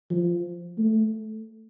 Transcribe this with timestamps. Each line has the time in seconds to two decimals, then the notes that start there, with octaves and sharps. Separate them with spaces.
0.10 F3
0.78 A3